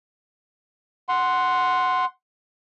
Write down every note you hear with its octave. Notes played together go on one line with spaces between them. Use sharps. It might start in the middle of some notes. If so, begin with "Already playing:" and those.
F#5 C6